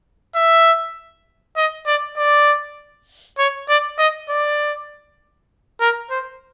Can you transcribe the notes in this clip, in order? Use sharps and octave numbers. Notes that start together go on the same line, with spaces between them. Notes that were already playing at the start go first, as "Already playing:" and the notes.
E5
D#5
D5
D5
C#5
D5
D#5
D5
A#4
C5